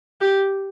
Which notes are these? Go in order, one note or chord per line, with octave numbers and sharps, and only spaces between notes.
G4